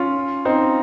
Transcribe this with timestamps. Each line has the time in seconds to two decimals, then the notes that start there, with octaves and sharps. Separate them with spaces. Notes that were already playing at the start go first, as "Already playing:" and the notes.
Already playing: C#4 F4
0.45 C4 D#4